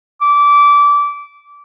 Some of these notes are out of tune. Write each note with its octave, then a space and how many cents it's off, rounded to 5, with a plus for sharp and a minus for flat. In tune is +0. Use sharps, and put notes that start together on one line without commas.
D6 -20